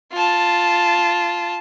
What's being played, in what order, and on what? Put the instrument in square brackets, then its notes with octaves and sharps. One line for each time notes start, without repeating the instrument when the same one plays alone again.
[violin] F4 A5